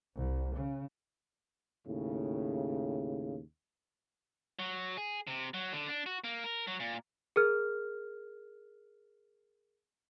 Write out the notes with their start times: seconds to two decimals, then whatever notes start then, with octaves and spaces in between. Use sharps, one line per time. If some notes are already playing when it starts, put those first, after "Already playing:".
0.16 C2
0.56 C#3
1.87 D#2 A2 C#3
4.59 F#3
4.97 G#4
5.27 C3
5.54 F#3
5.73 D3
5.88 D4
6.06 F#4
6.24 A#3
6.44 A#4
6.67 F#3
6.80 A#2
7.36 G#4 A#4 F6